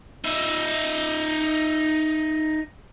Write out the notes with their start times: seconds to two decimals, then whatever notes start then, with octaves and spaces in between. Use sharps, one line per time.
0.24 D#4 E5